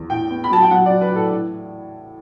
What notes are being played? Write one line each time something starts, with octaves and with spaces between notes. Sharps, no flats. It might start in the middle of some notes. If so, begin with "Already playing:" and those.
Already playing: E2
A2 G5
B3
B5
F#3 A5
G5
F#3 F#5
F#3 D5
B4
A2 A4
E3